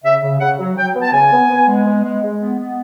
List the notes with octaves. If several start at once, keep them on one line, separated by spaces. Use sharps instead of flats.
C#3 E5
C#3
C#3 F#5
F#3
F#3 G5
B3
A5
C#3 G#5
B3
B3
G#3
B3
G#3
G#3
B3
B3